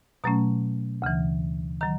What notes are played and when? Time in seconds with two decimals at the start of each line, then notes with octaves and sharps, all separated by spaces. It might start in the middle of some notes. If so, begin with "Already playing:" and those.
0.24 B2 F#3 A3 C#4 A#5
1.02 D2 C#3 E3
1.81 D#3 F#3 A#5